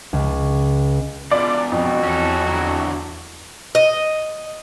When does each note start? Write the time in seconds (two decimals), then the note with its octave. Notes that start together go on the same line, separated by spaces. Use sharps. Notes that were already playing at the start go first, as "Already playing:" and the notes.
0.13 C#2
1.31 E2 B2 F4 D5
1.72 F2 F#4
2.03 E2 C#4 E4 A4
2.47 D3 F#3
3.75 D#5